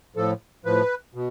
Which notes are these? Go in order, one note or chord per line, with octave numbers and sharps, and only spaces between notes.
A2 F3 A4
A2 F3 B4
B2